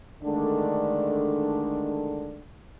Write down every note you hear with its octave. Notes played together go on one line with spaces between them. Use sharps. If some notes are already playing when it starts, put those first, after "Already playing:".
D3 D#3 G#3 A3 D4